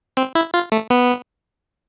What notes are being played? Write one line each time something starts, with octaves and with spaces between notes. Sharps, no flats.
C4
E4
F4
A3
B3